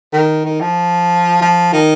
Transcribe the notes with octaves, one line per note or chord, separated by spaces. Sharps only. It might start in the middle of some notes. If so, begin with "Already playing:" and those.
D#3
D#3
F3
F3
D#3